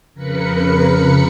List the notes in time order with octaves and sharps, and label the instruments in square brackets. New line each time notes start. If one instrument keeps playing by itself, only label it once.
[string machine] F2 C#3 A#4 B4 B5 C#7